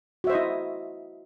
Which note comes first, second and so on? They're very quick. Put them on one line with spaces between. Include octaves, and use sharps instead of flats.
F#4 E5 C5 D#5 E4